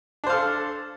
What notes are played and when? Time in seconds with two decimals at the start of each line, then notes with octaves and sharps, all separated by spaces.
0.24 D4
0.27 C5
0.30 F5
0.32 A4